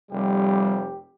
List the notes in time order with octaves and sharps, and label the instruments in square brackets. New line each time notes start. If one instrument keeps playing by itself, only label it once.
[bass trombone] F1 [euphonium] G3 [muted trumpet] G4